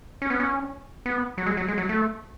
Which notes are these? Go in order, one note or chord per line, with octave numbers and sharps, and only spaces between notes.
C#4
B3
C#4
B3
F#3
G#3
F#3
G#3
F#3
A3